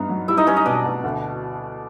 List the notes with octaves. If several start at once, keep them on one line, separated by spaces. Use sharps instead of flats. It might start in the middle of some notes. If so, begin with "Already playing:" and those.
Already playing: G2 B3 D#4
F#3
G3 E4 E5
D#4 D#5
G3 C#4 C#5
D#4 D#5
B2 D4 D5
B2
D2